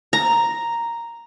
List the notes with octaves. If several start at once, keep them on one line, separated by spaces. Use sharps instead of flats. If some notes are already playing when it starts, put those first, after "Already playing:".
A#5